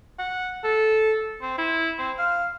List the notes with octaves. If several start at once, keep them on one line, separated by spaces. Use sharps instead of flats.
F#5
A4
C4
E4
C4
F5